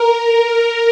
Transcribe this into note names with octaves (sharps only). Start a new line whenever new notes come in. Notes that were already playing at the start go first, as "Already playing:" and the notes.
Already playing: A#4